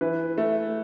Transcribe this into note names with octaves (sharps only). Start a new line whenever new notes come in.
E3 B4
A3